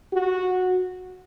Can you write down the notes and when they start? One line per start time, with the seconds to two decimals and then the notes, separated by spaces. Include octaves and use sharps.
0.13 F#4